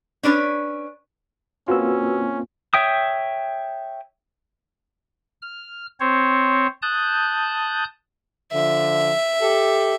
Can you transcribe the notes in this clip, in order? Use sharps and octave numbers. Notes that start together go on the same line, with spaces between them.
C#4 D4 B4 C#5
A#3 C4 C#4 F4 F#4 B4 E6
C#5 E5 G5 D#6
F6
C4 C5 C#5
A5 D#6 F#6 G6
D3 F3 E5
G4 A4